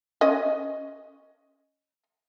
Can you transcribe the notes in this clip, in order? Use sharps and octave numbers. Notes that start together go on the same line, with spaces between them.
C#4 D#5